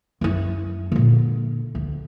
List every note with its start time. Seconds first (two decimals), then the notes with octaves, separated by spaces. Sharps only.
0.21 F#2 E4
0.92 A#2 D3
1.75 D2